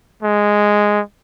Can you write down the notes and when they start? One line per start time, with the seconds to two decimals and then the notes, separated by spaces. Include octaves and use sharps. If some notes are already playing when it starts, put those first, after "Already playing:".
0.23 G#3